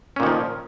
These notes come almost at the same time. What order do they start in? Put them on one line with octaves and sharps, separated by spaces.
C#4 A#2 D#3 F3